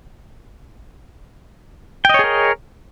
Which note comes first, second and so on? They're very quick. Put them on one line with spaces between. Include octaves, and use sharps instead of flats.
G5 D#5 C#5 G#4 A#4